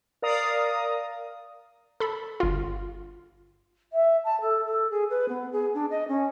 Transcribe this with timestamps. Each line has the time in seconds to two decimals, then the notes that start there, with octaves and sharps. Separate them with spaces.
0.22 A#4 D5 F5 A#5 D#6
2.00 A4 B5
2.40 G1 F4
3.93 E5
4.24 A5
4.41 A4
4.65 A4
4.90 G#4
5.10 B4
5.29 B3
5.52 G#4
5.74 D4
5.90 D#5
6.08 C#4